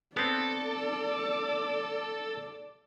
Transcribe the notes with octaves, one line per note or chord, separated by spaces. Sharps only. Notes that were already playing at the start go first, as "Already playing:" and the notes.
B3 C4 A4 D5